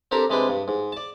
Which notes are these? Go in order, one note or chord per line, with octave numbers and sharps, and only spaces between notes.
C4 D4 G4 A4 A#4 A#5
C3 G#3 D4 B4 G5
G2
G#2
D5 A5